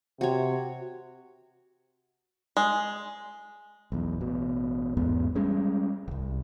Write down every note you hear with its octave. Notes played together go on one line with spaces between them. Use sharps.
C3 F#4 C#5
G#3
B1 E2
A1 B2
A1 E2 G#2 B3
G3 G#3 C#4
D#1 C2